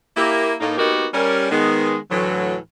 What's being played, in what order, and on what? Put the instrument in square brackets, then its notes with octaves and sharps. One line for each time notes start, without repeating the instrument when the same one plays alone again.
[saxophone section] A#3 E4 G4
A2 A#3 D#4
A#3 B3 D#4 F#4 G4 A#4
G3 C#4 A#4
D#3 G#3 B3
D2 A2 E3 F#3